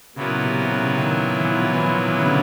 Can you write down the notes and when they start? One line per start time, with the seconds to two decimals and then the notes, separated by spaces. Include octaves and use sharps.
0.16 A#2 C#3 F#3 B3 E4
0.43 C3
0.63 C3
0.71 C#3
0.98 D#3
1.38 E3
1.50 F3
1.62 E3
1.74 E3
1.80 F3
2.07 E3
2.19 C#3
2.25 D3